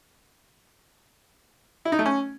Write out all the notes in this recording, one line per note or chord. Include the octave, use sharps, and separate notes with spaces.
E4
D#4
A3
C#4